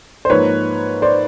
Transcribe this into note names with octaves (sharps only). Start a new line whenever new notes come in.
C5
G#2 F3 A#3 B4 C#5
C5 D5